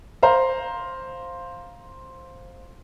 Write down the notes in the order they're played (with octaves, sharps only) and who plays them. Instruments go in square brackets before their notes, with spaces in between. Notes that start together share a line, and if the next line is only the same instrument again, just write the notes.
[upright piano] C5 F5 A#5